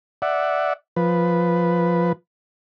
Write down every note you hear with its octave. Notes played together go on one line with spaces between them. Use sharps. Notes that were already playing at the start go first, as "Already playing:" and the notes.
D5 E5 F#5
F3 B4